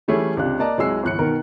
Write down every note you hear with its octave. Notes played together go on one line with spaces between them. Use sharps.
E3 G3 A3 C#4 E4 G#4
C#2 C3 D4 G4 F5 F#6
A#3 D5 D#5 A5 A#5
C2 F#3 G#3 G#5 E6 C7
G1 E2 F#6 C#7
B2 D#3 A#4